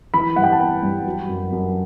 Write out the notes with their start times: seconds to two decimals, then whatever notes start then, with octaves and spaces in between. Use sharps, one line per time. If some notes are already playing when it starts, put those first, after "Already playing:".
0.14 E3 B5
0.36 G2 F#5
0.44 G5
0.52 A5
0.60 B3 B5
0.83 G2
1.07 F#3
1.29 F#2
1.52 F#2